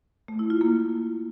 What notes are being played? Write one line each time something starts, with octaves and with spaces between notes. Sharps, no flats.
A3
E4
F4
A#3